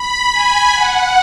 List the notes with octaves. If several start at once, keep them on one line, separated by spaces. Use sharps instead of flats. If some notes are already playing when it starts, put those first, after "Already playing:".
Already playing: B5
G#5
F#5